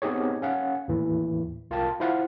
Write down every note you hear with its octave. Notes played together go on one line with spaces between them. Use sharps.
B3 C4 D#4 G4 G#4 C#5
C#4 F5 F#5
D#2 A2 E3
C2 F4 A#4 F5 G5 A5
E4 F4 C5 F5 F#5